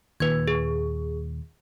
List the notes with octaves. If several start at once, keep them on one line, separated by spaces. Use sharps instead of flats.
D#2 A#2 B4 G#6
G#4